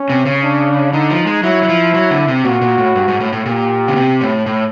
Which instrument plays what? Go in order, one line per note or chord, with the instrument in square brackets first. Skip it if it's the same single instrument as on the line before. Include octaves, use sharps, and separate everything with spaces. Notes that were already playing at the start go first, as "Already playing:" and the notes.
Already playing: [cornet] C#4
[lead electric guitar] C3
C#3
[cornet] D4
[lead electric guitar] D3 [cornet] D#4
[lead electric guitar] F3
G#3
[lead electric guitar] F#3 [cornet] E4
[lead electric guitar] F#3
F3
F#3
D3
C3
[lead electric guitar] A#2 [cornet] F#4
[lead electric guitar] A#2
A2
G2
G#2
A2
A2
[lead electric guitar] A#2 [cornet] G4
[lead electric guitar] C#3
C3
A2
A2